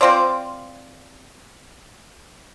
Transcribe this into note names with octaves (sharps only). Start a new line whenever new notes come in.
C4 F4 C5 D5